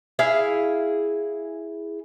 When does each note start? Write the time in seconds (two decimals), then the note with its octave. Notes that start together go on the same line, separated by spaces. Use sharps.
0.19 E4 G#4 F5